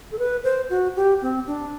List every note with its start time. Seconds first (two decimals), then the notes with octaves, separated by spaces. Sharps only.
0.12 A4
0.19 B4
0.44 C5
0.70 F#4
0.96 G4
1.22 C4
1.47 D4